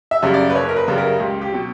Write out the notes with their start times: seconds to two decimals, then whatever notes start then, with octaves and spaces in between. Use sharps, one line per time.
0.11 E5
0.22 F#2 C#3 G3
0.34 D5
0.50 B4
0.55 F#1 C#5
0.69 A#4
0.76 B4
0.88 F#2 C#3 G3 G4
0.98 A#4
1.20 C#2 G4
1.42 G4
1.52 B2 F#3